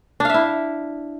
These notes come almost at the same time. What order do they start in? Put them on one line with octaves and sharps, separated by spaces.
D4 F5 E5 E4